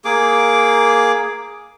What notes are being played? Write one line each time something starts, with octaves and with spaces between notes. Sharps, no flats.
A#3 G#4 D6